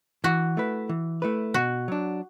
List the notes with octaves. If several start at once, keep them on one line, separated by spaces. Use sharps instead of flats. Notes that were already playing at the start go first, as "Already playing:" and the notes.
E3 F#4
A3 E4 B4
E3
A3 E4 B4
B2 F#4
F#3 D4